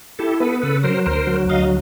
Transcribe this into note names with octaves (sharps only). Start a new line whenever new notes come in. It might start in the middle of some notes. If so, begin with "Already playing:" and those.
E4 G4 A4
B3 A4 B4
C#3 A4 B4
F#3 A#4 C5
D2 A#4 C5
F#3
D2 D#5 F5